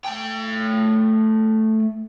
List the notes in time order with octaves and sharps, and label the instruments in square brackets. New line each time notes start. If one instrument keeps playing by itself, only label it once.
[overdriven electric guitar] A3 G5